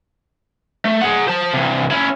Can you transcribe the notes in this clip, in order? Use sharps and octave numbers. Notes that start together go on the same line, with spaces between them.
A3
G#4 F#5
C5 A5
C3 E3
C#4 E4